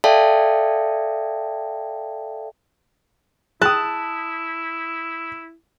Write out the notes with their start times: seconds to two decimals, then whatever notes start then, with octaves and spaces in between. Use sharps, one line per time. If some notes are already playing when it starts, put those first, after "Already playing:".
0.04 A4 D5 E5 F5 G5 A5
3.62 E4 G#4 G5 A5 D#6 F#6